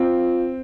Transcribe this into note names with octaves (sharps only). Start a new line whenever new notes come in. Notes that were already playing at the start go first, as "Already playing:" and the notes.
Already playing: C4 F4